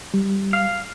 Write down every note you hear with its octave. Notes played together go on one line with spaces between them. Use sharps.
G3
F5